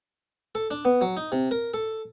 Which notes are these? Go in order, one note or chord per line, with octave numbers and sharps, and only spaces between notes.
A4
D4
B3
F#3
D#4
C3
A#4
A4